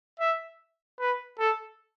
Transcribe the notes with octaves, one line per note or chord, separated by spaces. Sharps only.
E5
B4
A4